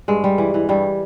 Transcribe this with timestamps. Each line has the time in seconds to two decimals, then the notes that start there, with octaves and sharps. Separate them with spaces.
0.08 G2 G#3
0.24 G3
0.38 E3
0.54 E3
0.69 G2 G3